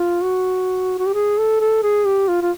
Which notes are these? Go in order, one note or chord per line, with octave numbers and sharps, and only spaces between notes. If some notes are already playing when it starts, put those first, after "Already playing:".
Already playing: F4
F#4
F#4
G4
G#4
A4
A4
G#4
G4
F4
F4